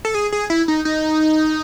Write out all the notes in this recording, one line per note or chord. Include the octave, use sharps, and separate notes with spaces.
A4
G#4
G#4
E4
D#4
D#4